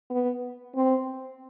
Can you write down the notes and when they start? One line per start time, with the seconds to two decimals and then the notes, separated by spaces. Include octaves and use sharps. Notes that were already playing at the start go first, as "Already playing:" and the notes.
0.10 B3
0.75 C4